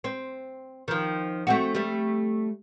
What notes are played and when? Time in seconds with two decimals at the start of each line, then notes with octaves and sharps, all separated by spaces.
0.04 C4
0.88 D#3 F3
1.47 A3 C4 F#4
1.75 G3 A3